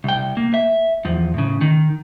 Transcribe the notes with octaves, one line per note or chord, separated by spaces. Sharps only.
C2 G5
A#3
E5
E2 F3
A2 C#3
D#3